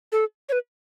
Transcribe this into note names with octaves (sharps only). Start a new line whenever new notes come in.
A4
C#5
B4